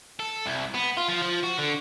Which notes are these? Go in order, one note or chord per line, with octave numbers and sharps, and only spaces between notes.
A4
C2
B3
F4
F3
F3
F#4
D3